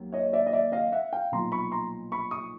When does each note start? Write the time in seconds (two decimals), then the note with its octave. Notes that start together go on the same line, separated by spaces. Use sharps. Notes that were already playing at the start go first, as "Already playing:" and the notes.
Already playing: D#2 F#3
0.13 C#5 D#5
0.33 D5 E5
0.46 D#5
0.53 D5 E5
0.72 D#5 F5
0.92 E5 F#5
1.13 F5 G5
1.32 B1 A#2 F3 A#5 C6
1.52 B5 C#6
1.72 A#5 C6
2.12 B5 C#6
2.31 C#6 D#6